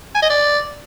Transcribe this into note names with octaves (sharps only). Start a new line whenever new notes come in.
G#5
D#5
D5